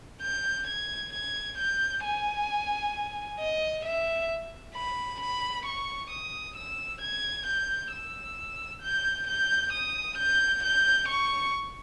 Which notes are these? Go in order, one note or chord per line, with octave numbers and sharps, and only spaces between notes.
G6
G#6
G#6
G6
G#5
D#5
E5
B5
B5
C#6
D#6
E6
G#6
G6
E6
G6
G6
D#6
G6
G6
C#6